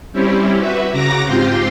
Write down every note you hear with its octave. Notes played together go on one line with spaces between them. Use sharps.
G3 C4 C#4 E4 G4
F#4 B4 E5
C#3 F#4 A#5 D6 A#6
G#2 C4 F4 G4 G5 C6